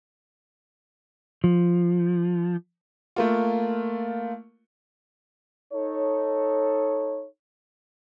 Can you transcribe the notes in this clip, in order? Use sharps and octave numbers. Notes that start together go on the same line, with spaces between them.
F3
A3 A#3 F4
D#4 A4 C#5